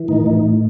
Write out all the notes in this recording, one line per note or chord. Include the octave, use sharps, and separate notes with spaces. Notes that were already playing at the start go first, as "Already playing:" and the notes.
Already playing: E3
A2 D#3 D#4
A2